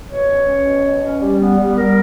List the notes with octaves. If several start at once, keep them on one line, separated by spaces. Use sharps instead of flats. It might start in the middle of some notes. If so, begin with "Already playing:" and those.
B2 C#5
C#4
C#4
B2
B2
C#4
G3
B3
G3
G3 A#4